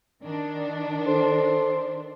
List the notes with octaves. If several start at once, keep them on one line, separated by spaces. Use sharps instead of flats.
D#3 D4
A4 C5